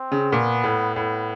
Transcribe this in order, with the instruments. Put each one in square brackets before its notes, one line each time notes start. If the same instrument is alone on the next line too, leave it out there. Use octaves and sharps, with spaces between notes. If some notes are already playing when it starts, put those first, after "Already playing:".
Already playing: [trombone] C4
[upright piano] C#3
[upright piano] A#2 [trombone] B3
[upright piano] A2
[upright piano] A2 [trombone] B3